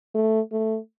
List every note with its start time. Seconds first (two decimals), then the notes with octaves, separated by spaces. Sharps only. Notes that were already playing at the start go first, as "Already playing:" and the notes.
0.15 A3
0.52 A3